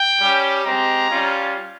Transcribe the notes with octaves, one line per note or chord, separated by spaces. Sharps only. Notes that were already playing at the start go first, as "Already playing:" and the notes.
Already playing: G5
G3 C#4 G4
G#3 C4 G4 A#5
G3 C#4 F4